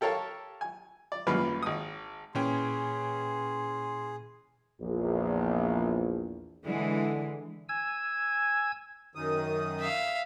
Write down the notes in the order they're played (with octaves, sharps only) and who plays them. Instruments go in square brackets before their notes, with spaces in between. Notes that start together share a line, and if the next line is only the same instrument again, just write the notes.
[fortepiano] G4 A4 A#4 C#5 F5 A5
G#5
D5
G#1 F#2 G3 A#3 F4 B4
G#1 D#6
[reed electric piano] A#2 [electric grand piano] E3 C#4 G5 [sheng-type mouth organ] G#4 [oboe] C6
[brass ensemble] A#1 E2
[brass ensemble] D3 [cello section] E3 G#3
[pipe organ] G#5 E6 G#6
[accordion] F#2 D#3 D#6
[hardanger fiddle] E5 F5